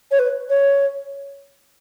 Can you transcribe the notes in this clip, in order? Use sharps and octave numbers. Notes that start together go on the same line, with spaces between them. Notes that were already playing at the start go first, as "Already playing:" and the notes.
C#5
B4
C#5